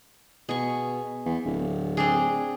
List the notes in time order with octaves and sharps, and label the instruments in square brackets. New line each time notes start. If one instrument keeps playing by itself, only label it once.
[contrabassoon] B2 [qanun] G#4 C#6
[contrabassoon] E2
D1
[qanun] C4 D4 G#4